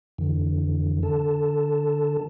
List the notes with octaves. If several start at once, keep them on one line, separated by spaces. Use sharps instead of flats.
F2 D3 E3
D3 A4 A5